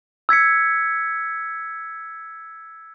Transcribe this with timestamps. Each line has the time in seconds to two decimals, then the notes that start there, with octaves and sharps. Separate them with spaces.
0.29 E6 G#6 B6 C#7